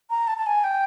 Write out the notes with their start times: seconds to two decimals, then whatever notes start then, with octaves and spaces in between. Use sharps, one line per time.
0.10 A#5
0.27 A5
0.38 A5
0.46 G#5
0.64 G5